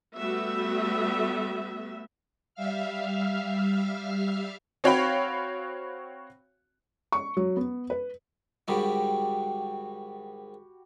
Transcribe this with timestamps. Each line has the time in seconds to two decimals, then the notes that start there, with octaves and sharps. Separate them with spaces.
0.16 G3 A3 B3 F#4 E5
2.55 G3 E5 F5 F6
4.84 C4 F#4 C#5 F5 G5 B5
7.12 C#6
7.37 F#3
7.57 B3
7.90 B4
8.68 G#2 D#3 G3 F#4 G4 B5